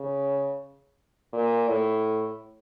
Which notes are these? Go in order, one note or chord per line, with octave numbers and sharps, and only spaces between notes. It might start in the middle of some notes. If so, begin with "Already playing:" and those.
Already playing: C#3
A#2
A2